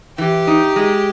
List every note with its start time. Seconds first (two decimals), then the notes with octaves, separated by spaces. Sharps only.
0.18 E3 G4
0.47 D#4
0.76 G#3